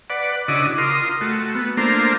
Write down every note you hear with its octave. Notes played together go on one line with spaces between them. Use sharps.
B4 D5 F#5
C#3 D4 E4 F#4 D#5 D6
F4 A#4 C6 D#6
A3 F#4
B3
A3 A#3 D4 F4 A#4 C5